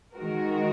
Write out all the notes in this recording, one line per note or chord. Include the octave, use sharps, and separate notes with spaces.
D#3 G#3 F#4 A#4